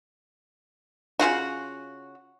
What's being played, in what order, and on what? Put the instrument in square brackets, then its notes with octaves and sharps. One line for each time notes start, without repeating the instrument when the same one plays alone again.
[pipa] C#3 G#3 F4 F#4